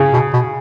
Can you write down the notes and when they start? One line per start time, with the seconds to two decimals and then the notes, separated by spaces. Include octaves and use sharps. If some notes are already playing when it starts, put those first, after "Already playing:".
Already playing: C#3
0.13 B2
0.33 B2